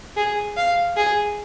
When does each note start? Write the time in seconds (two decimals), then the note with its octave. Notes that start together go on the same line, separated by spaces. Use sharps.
0.17 G#4
0.57 F5
0.97 G#4